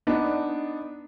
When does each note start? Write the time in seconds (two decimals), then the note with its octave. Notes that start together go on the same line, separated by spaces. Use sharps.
0.07 B3 D4 D#4